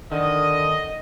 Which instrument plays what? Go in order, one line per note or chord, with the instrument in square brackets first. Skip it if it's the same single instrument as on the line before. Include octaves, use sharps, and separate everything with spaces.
[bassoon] D3 [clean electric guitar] D#3 [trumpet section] D#5